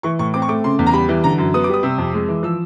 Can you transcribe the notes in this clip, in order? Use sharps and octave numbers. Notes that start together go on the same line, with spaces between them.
E3 C#6
A2 C#6
C4 D6
C#6
A3 D6
C#3 C6
E2
A#5
G3 B5
E3
D3 A#5
F#2
B3 D#6
D6
G3 D#6
C3 E6
F2
G#3
E3
F3 E6